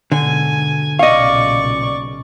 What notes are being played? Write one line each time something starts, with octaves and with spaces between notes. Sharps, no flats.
G#2 B2 D3 G#5
B1 A#2 C#3 D5 D#5 F5 C#6